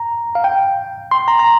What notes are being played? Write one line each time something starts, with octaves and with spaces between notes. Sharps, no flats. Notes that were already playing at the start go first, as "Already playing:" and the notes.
Already playing: A#5
F5
G5
C6
A#5
A#5